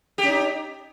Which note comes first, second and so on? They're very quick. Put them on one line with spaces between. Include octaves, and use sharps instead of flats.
G4 C#4 D#4